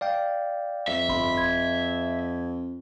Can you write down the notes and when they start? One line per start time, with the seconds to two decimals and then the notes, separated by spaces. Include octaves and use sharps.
0.01 D5 F5 G5
0.88 F2 E5
1.09 G1 B5 C6
1.38 G#6